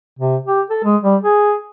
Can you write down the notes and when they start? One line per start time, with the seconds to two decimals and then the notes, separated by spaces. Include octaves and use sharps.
0.19 C3
0.46 G4
0.70 A4
0.84 G#3
1.04 G3
1.23 G#4